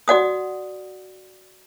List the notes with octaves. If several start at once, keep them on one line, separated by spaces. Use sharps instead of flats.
F#4 D5 F#5 D#6